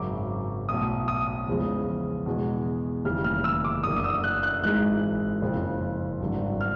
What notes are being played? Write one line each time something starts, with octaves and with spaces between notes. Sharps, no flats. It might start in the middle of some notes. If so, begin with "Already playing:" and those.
Already playing: G#1 F#2 C#3 F#3 D6
B1 A2 F#3 D#6
D#6
E2 C#3 F3 G#3
E2 B2 G#3
F1 D#2 C#3 E3 G3 F6
F6
E6
D6
F#1 F#2 D3 D#6
D#6
E6
F#6
F#6
G#1 G#2 E3 G#3 F#6
F#1 F2 C#3 F3
G#1 G2 D3 F#3
F6